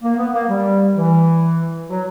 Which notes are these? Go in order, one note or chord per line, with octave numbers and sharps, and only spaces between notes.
A#3
B3
A#3
G3
E3
F#3